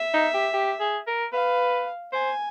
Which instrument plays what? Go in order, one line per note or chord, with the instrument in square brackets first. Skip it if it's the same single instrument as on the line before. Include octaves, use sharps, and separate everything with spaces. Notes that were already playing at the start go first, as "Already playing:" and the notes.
Already playing: [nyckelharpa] E5
[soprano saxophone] D#4
G4
G4
G#4
A#4
[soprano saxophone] B4 [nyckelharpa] F5
[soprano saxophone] C5 [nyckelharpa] G#5